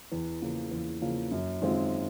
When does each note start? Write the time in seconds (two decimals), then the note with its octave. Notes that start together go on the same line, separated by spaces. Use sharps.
0.12 E2
0.42 C#3 F3 A#3
0.71 E2
1.01 C#3 F3 A#3
1.31 F#2
1.61 D#3 G#3 C4 F4